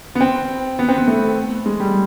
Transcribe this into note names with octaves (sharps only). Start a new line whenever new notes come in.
B3
C4
B3
C4
B3
A3
G#3
G3